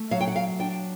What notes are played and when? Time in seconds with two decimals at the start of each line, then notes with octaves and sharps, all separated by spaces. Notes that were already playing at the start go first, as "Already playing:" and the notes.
Already playing: A3
0.11 F#3 F5
0.21 G5
0.27 F#5
0.36 F5
0.59 D4 G5